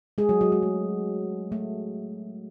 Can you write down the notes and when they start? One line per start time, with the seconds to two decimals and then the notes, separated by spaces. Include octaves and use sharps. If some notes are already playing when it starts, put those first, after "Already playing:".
0.18 G#3 G#4
0.29 F#3 F#4
0.41 F#3 F#4
0.52 G#3 G#4
0.62 A3
1.52 A3